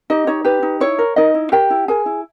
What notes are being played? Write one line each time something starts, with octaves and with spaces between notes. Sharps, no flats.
D#4 G4 D#5
D#4 C#5
G4 B4
D#4
E4 C#5
A#4
D#4 A#4 D#5
E4
G4 A#4 G5
E4
G#4 A#4 G#5
E4